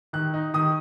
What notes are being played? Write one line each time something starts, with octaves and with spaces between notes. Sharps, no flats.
D#3 F#6
D#4
D#3 D#6